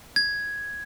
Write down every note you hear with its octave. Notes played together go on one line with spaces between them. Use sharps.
G#6